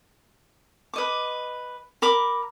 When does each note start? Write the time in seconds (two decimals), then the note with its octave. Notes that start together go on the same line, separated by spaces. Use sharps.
0.94 B4 D#5 D6
2.02 A#4 B5 D6